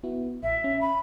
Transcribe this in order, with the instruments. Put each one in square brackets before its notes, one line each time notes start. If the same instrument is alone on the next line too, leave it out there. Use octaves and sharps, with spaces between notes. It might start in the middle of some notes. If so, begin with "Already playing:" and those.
[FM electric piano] B3 E4 F#4
[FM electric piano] A#1 [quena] E5
[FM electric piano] C#4
[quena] B5